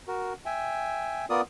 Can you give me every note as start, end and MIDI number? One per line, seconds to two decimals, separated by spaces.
0.08 0.33 66
0.08 0.33 70
0.46 1.25 76
0.46 1.25 79
0.46 1.25 80
1.30 1.41 59
1.30 1.41 65
1.30 1.41 70
1.30 1.41 74
1.30 1.41 87